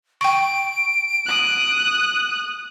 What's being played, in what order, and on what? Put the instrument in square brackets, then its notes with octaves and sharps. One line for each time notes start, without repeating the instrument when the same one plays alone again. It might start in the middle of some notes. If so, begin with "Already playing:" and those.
[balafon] G5 C#6 [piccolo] D7
[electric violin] D#6 F#6